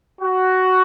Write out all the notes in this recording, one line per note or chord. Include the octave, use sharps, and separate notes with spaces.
F#4